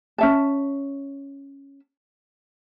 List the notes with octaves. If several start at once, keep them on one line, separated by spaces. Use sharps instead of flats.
C#4 E5 A5